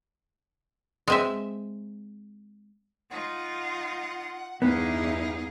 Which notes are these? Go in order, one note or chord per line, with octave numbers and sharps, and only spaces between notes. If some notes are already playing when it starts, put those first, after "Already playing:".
G#3 C4 E5
D#4 F4 F#5
E2 G2 B3 D#4 E4 G#4 F5